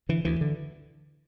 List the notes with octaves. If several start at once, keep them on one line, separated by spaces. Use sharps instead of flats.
D3 E3
D2 E3
D3